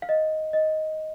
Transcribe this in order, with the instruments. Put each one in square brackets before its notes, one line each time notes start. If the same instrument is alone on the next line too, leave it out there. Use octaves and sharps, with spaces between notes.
[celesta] F5
D#5
D#5